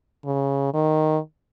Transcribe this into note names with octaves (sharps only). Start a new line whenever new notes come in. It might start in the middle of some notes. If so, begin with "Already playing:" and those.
C#3
D#3